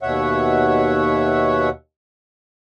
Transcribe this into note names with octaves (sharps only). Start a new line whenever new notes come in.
D#2 B2 C#5 E5 F#5